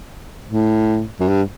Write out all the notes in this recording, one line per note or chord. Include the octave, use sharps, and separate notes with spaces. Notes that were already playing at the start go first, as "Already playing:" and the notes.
A2
F#2
G2